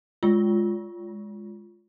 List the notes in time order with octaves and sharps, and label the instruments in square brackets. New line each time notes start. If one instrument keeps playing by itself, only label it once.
[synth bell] G#3 F4